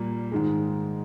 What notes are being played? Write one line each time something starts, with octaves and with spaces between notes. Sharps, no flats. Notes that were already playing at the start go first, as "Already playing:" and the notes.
Already playing: A#2 G3 A#3
G#2 D#3 G#3